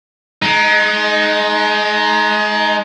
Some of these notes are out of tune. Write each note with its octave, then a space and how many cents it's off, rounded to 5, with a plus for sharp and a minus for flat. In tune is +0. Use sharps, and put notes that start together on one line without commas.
G#3 +30 D#4 +0